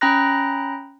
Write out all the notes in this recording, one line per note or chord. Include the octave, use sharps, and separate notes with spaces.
C#4 G5 A#5 B5 F#6 A#6